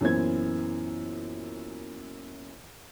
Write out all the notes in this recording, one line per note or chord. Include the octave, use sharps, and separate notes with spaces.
F#2 A#2 E3 B3 C5 G#6